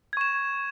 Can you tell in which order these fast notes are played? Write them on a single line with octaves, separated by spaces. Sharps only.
G#6 C#6 E7